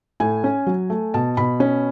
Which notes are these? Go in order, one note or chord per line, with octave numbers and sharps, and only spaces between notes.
A2 G#5
C#4
F#3
A3
B2 A5
B2 B5
C#4